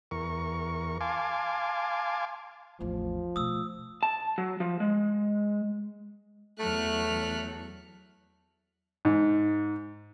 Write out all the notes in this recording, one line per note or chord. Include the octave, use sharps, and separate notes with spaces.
E2 A#4 C#6
F5 G#5 A5 C6 D6
A1 E2 F3
B2 A3 D#6 E6
A5
F#3
F3
G#3
E2 F#3 A3 F6 F#6
G#2